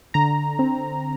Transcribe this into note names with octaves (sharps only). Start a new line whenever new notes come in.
D3 A#5
C4